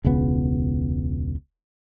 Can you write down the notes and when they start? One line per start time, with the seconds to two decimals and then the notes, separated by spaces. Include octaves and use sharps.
0.04 E1 C#2 C#3 B3